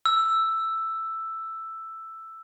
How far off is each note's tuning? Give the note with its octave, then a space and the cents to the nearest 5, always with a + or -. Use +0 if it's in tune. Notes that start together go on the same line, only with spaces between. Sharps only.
E6 +5